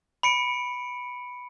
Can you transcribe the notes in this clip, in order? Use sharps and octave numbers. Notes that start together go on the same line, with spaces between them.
B5 C#7 D7